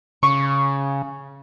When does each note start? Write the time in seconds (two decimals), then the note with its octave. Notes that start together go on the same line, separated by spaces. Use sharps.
0.23 C#3 C#6